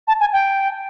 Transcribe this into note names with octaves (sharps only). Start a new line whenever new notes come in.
A5
G#5
G5